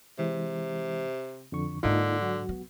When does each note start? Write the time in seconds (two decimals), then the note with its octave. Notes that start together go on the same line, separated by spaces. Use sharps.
0.19 C3 E3 G#3
1.52 F2 D3 C#6
1.83 G#2 D3 A#3 D4 D#4 F4
2.22 F#3 F#4
2.49 B3